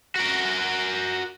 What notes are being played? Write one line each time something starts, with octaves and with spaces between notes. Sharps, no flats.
F#4 A#4